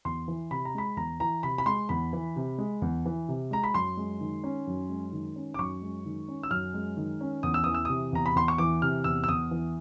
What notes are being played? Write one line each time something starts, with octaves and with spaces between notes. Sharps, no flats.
E2 C6
E3
C3 B5
A#5
G#3 B5
E2 A#5
E3 A#5
C3 B5
B5
G#3 C6
E2 B5
E3
C3
G#3
E2
E3
C3
G#3 A#5
B5
F#2 C6
G#3
D#3
C#4
F#2
G#3
D#3
C#4
D6
F#2 C#6
G#3
D#3
C#4
E6
F#2 F6
G#3
D#3
C#4
E2 D#6
E6
E3 D#6
E6
C3 D#6
E2 A#5
B5
E2 C6
C#6
E3 D6
C3 F6
E2 E6
E6
E2 D#6
E3